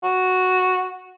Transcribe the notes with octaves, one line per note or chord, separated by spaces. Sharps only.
F#4